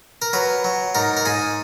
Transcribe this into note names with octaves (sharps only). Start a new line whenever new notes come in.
A#4
F#3 B4
F#3
G#2 A#4
A#4
G#2 G#4